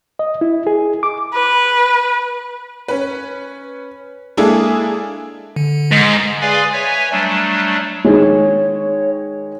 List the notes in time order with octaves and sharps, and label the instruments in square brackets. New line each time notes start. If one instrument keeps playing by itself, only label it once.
[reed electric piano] D#5
E4
G#4
D6
[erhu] B4
[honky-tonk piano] C#4 B4
G#3 A#3 D4 E4 G#4 A4
[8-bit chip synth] D3
[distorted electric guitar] G#2
[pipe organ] G#4 B4 D5 F5 G#5 C6
B4 C#5 E5 G#5
F#3 G3 A3 D4
[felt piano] D#3 G#3 [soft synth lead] C#5